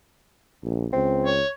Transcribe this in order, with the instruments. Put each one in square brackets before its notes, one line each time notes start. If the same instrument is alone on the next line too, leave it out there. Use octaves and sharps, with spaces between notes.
[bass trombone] A#1
[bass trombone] C#2 [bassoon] C4
[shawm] C#5